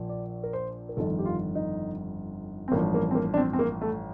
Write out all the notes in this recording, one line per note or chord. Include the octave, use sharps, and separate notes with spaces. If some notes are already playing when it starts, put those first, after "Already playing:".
Already playing: A#1 A#2 F3
D5
A#4
C5
A#4
G1 F2 D#3 A4
G4
F4
D#4
C4
A1 G2 F3 A#3
A#3
C4
A#3
D4
C4
C4
A#3
A3